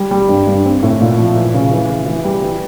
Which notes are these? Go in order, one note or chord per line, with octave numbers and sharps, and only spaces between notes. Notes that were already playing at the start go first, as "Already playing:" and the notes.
Already playing: G3
G3
G2
G2
C4
A2
A#2
F3
E3
C#3
E3
E3
E3
G3
E3